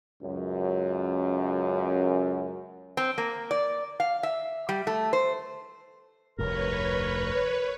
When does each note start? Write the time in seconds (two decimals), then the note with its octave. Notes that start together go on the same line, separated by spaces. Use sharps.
0.22 C#2 F#2
2.97 C4
3.18 A#3
3.51 D5
4.00 F5
4.23 E5
4.69 G3
4.87 A3
5.13 C5
6.39 F1 D2 G2 A#4 B4 C#5